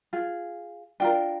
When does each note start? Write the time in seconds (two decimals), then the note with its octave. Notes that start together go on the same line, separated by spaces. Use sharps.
0.13 F4 G#4
1.00 D4 F4 A#4 G5